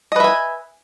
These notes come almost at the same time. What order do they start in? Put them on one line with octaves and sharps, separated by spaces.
D#5 B4 E5 G#5